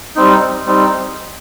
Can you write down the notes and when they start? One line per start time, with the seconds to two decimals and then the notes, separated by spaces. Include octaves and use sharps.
0.16 G3 C4 D#4
0.66 G3 C4 D#4